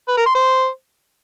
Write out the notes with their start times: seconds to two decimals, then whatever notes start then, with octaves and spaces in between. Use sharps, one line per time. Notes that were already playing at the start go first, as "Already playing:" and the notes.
0.08 B4
0.17 A#4
0.26 C6
0.35 C5